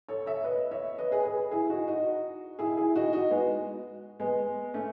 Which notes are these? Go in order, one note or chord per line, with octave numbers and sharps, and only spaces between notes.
A4 C#5
C#5 E5
B4 D#5
C#5 E5
B4 D#5
G#4 B4
G#4 B4
E4 G#4
D#4 F#4
D#4 F#4
E4 G#4
E4 G#4
D#4 F#4
D#4 F#4
G#3 B3
G#3 B3
A3 C#4